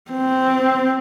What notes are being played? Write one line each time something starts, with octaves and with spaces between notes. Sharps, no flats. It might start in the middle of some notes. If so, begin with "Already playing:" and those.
C4